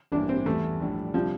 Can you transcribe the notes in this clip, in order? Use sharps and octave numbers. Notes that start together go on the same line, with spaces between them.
A1 G2 E3 A#3 D4
C4
E2 E3 G3 A3
A#1 A2 G3 D4
C3 F3 G3 D4